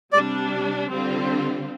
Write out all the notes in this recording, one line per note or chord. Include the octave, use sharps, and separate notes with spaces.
C3 G3 D4 D5
D3 G3 C4 F4